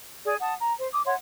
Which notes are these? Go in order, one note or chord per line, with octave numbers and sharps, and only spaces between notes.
G#4 D5
F#5 A5 D#6
A#5
C5
D6 D#6
C#5 E5 F#5 C6